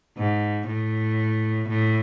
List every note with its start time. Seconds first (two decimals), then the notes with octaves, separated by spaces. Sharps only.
0.17 G#2
0.67 A2
1.69 A2